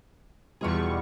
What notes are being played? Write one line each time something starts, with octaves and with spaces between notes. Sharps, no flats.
E2 B2 G3 F4 G#4 C#6